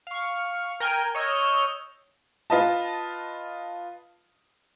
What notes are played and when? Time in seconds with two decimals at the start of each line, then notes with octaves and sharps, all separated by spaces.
0.07 F5 C#6
0.80 A#4 G5 G#5
1.15 C#5 D#5 E6 F6 G6
2.50 F4 B4 D#5 A5